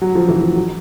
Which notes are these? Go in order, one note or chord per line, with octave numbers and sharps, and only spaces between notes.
F#3
F3
E3
F3
F#3